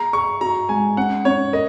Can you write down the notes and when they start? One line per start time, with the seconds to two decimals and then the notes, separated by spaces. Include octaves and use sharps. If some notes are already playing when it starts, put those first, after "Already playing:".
Already playing: G#4 A#5
0.13 G#4 C#6
0.41 F#4 A#5
0.69 G#3 G#5
0.97 C#4 F#5
1.25 C#4 C#5
1.53 A#4 D#5